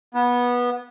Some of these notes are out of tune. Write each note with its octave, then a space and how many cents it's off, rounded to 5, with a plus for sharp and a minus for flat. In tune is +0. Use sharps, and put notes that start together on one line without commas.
B3 -15